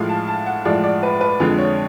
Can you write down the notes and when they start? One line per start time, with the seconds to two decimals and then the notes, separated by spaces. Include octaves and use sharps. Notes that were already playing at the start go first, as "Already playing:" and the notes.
Already playing: A2 F3 G#3 F5
0.09 A5
0.28 A5
0.46 F#5
0.65 A2 F3 G#3 D5
0.84 D5
1.03 B4
1.21 B4
1.40 F2 D3 F3 G#3
1.58 C#5